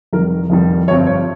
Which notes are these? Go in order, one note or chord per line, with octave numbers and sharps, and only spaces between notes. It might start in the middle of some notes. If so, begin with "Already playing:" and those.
F1 F2 D#3 G3 A#4
F1 F2 D#3 G3
G1 G2 F3 C4 C#5
C#5